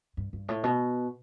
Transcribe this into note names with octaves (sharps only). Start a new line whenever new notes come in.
G2
G2
A2
B2